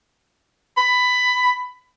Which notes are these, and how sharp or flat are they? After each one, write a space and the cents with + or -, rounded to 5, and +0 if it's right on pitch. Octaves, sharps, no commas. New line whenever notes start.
B5 +15